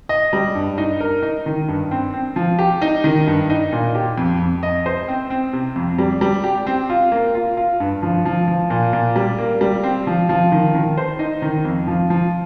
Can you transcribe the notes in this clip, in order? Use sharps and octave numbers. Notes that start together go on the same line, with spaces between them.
D#5
G3
G2
D#4
A#4
D#4
D#3
G2
C4
C4
F3
G4
D#4
D#3
G2
D#4
A#2
G4
F2
F2
D#5
C5
C4
C4
C3
F2
G3
G3
G4
C4
F4
A#3
F4
F4
G2
F3
F3
F3
A#2
A#2
G3
A#3
G3
C4
F3
F3
D#3
D#3
C5
D#4
D#3
F2
F3
F3